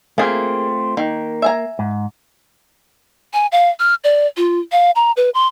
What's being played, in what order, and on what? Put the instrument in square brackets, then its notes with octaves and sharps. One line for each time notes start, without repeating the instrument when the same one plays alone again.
[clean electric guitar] A3 C4 F4 [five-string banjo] A#3 G#4
[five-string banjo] D#3 [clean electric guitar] A#3
[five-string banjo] E5 G#5 A#5
[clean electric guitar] G#2
[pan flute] G#5
F5
F6
D5
F4
F5
A#5
B4
C6